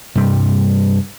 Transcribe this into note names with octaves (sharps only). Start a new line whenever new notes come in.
G2 C3 G3